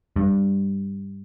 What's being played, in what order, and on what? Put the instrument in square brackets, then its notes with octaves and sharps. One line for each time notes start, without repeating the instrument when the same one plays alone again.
[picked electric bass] G2